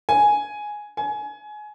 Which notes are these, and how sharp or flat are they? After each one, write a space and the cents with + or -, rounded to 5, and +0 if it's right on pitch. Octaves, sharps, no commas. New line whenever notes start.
G#5 +5
G#5 +25